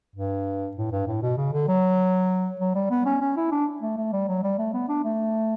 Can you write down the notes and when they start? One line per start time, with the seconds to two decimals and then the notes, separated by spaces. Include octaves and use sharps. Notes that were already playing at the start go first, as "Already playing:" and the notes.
0.16 G2
0.77 A2
0.92 G2
1.07 A2
1.22 B2
1.38 C#3
1.53 D3
1.68 F#3
2.60 F#3
2.75 G3
2.91 B3
3.06 C#4
3.21 C#4
3.37 E4
3.52 D4
3.82 A3
3.97 A3
4.13 G3
4.28 F#3
4.43 G3
4.58 A3
4.74 B3
4.89 D4
5.04 A3